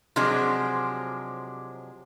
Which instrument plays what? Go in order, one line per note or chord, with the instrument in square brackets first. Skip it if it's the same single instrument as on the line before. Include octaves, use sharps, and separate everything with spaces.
[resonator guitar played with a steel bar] C3 F3 F#3 G#3 D4